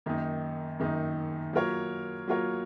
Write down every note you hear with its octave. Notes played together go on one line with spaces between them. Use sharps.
F#2 D#3 A#3 D#4
F#2 D#3 A#3 D#4
F#3 A#3 F4 A#4 C#5
F#3 A#3 F4 A#4 C#5